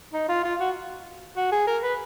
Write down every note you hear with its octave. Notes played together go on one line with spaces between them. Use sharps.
D#4
F4
F4
F#4
F#4
G#4
A#4
B4